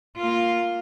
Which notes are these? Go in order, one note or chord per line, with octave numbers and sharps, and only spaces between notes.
A#3 F4